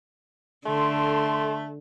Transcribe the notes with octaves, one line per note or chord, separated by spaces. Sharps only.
D3 A3 A5 C6